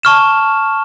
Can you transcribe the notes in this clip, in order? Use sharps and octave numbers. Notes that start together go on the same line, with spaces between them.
A5 C#6 F6 E7